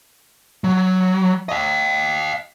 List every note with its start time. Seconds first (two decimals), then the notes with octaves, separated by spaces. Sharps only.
0.64 F#3
1.49 D#5 F5